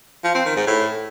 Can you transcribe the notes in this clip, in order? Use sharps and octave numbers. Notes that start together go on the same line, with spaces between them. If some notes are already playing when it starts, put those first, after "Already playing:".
F3
C4
D#3
G#2
A2